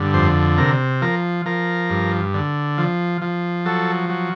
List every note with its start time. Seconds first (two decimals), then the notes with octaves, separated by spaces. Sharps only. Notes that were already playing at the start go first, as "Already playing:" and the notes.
Already playing: G2 D3
0.14 F2 C5
0.58 C3 A#4
1.02 F3 A#4
1.46 F3 A#4
1.90 G2
2.34 D3
2.78 F3
3.21 F3
3.65 F#3 A4
4.09 F#3